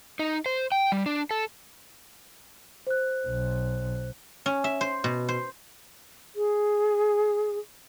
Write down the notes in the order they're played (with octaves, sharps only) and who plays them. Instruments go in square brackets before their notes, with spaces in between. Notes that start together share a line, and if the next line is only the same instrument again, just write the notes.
[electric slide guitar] D#4
C5
G5
G3
D4
A4
[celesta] C5 F#6
[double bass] B1
[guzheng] C#4
E5
C5
B2
C5
[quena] G#4